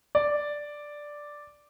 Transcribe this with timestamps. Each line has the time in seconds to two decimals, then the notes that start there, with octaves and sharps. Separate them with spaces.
0.15 D5